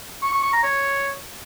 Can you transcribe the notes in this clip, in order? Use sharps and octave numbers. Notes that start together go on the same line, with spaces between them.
C#6
C#6
C#6
A#5
C#5